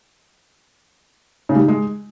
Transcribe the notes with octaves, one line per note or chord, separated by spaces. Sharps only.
C#3
G3
D#3
G#3